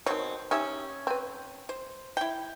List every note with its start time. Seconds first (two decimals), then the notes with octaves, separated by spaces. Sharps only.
0.06 B2 D#3 C4 C#5
0.51 C#4 D#4 G4 E5
1.07 C4 B4
1.69 C5
2.17 E4 G5